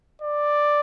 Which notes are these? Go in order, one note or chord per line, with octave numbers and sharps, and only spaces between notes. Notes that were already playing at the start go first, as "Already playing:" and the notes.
D5